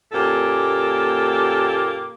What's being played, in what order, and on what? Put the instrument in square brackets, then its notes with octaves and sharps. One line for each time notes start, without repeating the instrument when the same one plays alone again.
[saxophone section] F#2 A#2 A#3 G4 A4